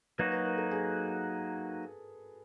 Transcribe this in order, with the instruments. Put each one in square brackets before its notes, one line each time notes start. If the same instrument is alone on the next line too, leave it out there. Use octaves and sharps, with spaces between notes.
[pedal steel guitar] F#3 A#3 D#4 F#4 [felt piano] B4
[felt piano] B4
A#4
A4
G#4